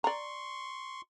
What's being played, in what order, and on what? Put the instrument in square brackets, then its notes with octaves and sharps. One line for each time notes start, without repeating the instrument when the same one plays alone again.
[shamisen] D5 A#5 [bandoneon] C6 C#6